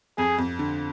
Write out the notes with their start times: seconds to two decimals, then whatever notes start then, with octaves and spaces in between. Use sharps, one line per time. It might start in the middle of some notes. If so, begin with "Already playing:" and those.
0.18 F2 G#4
0.38 F2
0.59 D3